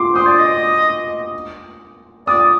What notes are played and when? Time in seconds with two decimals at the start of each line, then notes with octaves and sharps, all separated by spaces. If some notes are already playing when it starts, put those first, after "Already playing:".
Already playing: C6 D6
0.14 C5 D#6
0.26 D5
0.39 D#5
2.27 D5 D#6